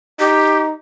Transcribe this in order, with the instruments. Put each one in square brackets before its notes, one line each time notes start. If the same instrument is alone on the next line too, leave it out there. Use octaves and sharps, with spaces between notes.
[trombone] D#4 [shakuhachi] G4